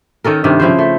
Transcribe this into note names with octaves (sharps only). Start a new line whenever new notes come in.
D#3 C#4 A4 A#4
G2 C3 D#3
C#3 F3 E4 C5
A3